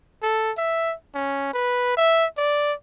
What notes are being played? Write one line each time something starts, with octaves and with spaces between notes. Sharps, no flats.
A4
E5
C#4
B4
E5
D5